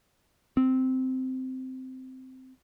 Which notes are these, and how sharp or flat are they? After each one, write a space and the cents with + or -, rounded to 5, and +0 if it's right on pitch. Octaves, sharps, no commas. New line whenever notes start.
C4 -10